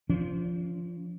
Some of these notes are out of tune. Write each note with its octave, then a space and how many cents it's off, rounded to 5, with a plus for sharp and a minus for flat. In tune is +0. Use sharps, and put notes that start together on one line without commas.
F3 -10 D4 -45